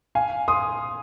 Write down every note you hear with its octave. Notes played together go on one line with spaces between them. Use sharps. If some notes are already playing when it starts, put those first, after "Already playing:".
F5 G#5
C6 D#6